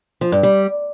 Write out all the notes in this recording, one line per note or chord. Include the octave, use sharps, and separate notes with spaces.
F3
G2
G3